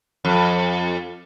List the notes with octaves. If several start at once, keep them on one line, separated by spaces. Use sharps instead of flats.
F2